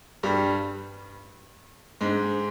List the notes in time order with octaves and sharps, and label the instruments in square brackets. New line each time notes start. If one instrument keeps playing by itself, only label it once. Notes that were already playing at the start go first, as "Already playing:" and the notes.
[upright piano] G2 G3
G#2 G#3